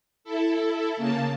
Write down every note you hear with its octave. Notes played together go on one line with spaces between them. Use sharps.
E4 A4
C#3 A#3 A5